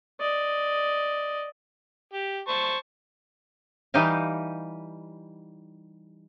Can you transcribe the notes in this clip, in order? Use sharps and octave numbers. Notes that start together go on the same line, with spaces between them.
D5 D#5
G4
C5 A5 C#6
E3 G3 D#4 G4 D#5 F5